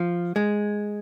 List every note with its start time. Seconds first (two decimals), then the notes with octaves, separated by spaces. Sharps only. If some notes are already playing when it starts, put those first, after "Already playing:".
Already playing: F3
0.36 G#3